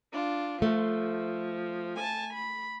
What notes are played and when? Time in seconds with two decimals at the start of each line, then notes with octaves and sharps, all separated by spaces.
0.12 D4 F4
0.62 F3 A3
1.95 G#5 A5
2.34 B5